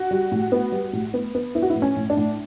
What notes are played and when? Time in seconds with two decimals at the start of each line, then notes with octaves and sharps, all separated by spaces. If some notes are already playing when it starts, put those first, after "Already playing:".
Already playing: F#4
0.11 G3
0.32 A2
0.52 B3
0.72 G3
0.93 A2
1.14 B3
1.35 B3
1.55 B3 E4
1.62 F#4
1.70 E4
1.75 A2
1.82 C#4
1.96 A2
2.10 D4
2.17 A2